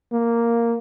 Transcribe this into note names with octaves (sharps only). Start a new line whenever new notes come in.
A#3